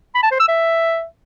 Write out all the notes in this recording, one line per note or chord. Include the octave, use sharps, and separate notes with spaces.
B5
A5
C5
E6
E5